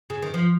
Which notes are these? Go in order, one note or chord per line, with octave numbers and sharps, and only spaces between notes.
C#3
D#3
F3